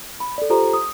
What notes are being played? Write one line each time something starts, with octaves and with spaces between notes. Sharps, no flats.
B5
A4 D5
F4 G4 A4 C5 A#5
D#6